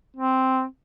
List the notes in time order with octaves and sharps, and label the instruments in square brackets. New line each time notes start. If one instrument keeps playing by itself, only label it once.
[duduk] C4